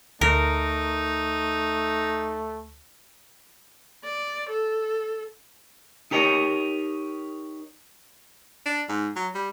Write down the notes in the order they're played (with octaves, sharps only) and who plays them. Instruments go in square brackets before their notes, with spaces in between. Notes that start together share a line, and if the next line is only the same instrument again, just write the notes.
[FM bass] D2 [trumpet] A3 [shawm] D#4 [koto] A#4
[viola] D5
A4
[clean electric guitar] D#4 G4 A#4 C#5 D#5
[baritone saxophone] D4
G#2
F#3
G3